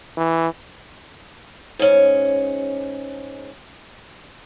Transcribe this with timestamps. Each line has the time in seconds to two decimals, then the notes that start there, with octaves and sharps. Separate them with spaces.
0.17 E3
1.79 G#2 C#4